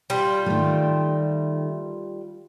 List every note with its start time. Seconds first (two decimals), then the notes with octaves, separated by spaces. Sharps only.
0.10 G3 F4
0.46 D#3 A3